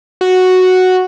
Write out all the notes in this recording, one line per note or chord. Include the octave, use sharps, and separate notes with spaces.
F#4